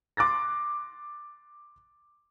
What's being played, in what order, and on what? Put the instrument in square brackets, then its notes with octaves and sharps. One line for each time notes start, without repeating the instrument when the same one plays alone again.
[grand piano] C6 D6 F#6 A6 A#6